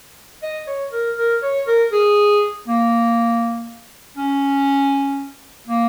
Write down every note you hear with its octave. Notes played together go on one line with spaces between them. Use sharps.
D#5
C#5
A#4
A#4
C#5
A#4
G#4
A#3
C#4
A#3